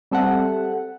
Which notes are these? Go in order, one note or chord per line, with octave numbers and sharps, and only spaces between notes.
G3 C4 A4 E5 F#5